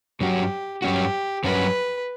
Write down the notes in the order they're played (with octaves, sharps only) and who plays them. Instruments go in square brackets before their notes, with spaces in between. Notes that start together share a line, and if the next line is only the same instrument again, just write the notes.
[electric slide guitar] G2 F#3 C#4 F#4 [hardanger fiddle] G4
[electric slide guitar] G2 F#3 C#4 F#4 [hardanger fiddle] G4
[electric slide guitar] G2 F#3 C#4 F#4 [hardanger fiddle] B4